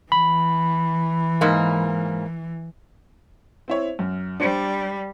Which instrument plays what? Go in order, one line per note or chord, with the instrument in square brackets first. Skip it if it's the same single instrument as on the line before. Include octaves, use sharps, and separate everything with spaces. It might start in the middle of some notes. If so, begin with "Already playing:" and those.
[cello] E3 [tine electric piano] B5
[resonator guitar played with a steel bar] G#2 A#3
[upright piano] C4 E4 C#5
F#2
[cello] G3 [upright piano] D4 C5